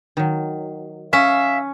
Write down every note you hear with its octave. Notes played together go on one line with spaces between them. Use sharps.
D#3 F#3
C#4 E5 F5